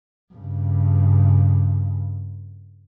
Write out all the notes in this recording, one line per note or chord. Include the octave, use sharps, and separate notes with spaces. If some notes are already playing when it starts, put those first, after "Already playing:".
G2 C#3